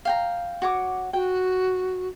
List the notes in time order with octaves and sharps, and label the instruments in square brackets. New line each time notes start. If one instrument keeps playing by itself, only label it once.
[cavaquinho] F5 G5 A#5
F#4 C#5 D6
[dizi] F#4 [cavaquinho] G5